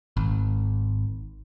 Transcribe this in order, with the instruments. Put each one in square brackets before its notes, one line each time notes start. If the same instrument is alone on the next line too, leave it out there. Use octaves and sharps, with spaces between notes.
[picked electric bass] G#1